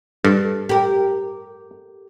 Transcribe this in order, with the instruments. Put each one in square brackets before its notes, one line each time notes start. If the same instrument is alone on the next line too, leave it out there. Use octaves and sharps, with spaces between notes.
[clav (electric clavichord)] G2 [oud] A4
[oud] G4 A#4